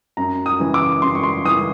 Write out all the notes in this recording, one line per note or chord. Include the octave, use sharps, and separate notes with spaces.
F#2 A#5
D#6
C#3 E3
D6
F#2 C6
C#6
C6
C#3 E3 D#6